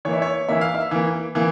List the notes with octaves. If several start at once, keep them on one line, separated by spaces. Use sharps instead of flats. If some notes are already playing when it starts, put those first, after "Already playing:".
E3 A#3 C#5
E5
C#5
E3 A#3 E5
F5
E5
E3 A#3
E3 A#3